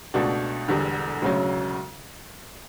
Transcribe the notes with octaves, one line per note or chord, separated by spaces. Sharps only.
C#2 B2 A3 D4 F#4
E1 E2 D3 G3
E1 D2 C#3 F#3 C#4